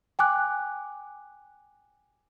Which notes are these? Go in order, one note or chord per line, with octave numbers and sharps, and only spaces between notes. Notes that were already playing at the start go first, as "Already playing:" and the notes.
G5 G#5 D6 F#6